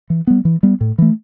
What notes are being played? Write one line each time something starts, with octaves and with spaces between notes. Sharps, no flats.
E3
G3 B3
E3
G3 B3
A2
E3 A3